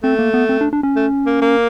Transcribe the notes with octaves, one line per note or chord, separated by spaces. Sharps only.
A3 C4
A#3
B3
C4
D4
D4
C#4
A3
A#3
A#3